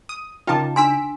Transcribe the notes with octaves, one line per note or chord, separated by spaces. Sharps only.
D#6
C#3 D#4 F4 A#4 G5 A5 D6
D4 C6 E6 B6 D7